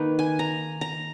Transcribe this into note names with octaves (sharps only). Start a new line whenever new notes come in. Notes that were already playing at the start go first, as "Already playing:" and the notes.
Already playing: D#3 A#3 D#4 B4
G#5
A#5
A#5